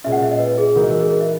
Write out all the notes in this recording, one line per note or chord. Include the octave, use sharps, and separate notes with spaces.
A#2 G#3 C#4 E5
F#5
E5
D#5
B4
G#4
E3 G#3 D#4 F#4 A#4
A#4
G#4
A#4
E5